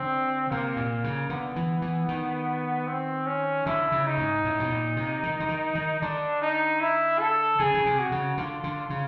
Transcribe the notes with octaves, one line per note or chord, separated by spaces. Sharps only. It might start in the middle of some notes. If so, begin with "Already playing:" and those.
Already playing: D3 C4
C3 A#3
A#2
C#3
D3 B3
E3
E3
D#3
C4
C#4
D3 E4
C#3
D#4
G#2
A2
B2
A#2
C3
D#3
D3
D#3
D#3
D3 D4
D#4
E4
A4
C#3 G#4
C#3
C3
F#4
C#3
D3 F4
D3
C#3